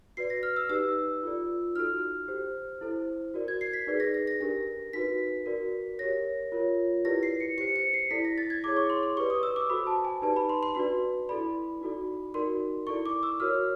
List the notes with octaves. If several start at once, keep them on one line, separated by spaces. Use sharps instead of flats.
F#4 B4 D5 C7
A#6
F6
E6
D#4 G4 B4 D5 E6
F4 A4 D5
D#4 F#4 A4 F6
G4 C5
E4 A4 C5
F#4 A#4 D5
G#6
C7
B6
D#4 G#4 B4 D5
A#6
A#6
A#6
D4 G4 A#4 A#6
D#4 F#4 B4 B6
F#4 A#4 D5
G4 A#4 C#5 A#6
F4 A#4 C#5
E4 G4 B4 D5 A#6
C7
C#7
G4 C5 C#7
C#7
C7
E4 A4 D5 B6
A#6
A6
G#6
E4 G#4 C#5 D6
C#6
C6
C6
G4 B4 D5 C#6
D#6
E6
D6
F#4 A4 C5 B5
A5
G#5
D#4 G4 B4 D5 A5
B5
C6
C6
D4 F#4 B4 D5 C6
E4 A4 D5 B5
D#4 F#4 A4 D5
D#4 F#4 A#4 D5 C6
E4 A4 D5 C#6
D6
E6
F#4 A#4 C#5 F6